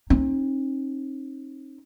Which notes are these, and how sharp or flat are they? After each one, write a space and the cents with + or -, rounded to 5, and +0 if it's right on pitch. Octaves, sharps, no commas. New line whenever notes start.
C4 +45 D#4 +0